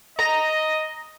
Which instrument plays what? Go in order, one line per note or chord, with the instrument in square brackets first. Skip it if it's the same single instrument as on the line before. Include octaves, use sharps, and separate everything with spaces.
[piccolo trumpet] D#5 [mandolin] A#5